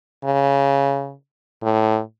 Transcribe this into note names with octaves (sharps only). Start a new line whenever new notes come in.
C#3
A2